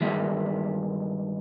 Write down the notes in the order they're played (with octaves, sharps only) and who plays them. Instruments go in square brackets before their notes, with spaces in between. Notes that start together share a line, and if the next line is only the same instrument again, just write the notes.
[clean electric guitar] G2 D#3 G#3 E5